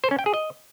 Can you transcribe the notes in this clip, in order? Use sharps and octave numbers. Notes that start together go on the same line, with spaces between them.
C5
C#4
G5
G#4
D#5